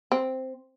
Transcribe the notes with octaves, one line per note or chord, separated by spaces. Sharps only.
C4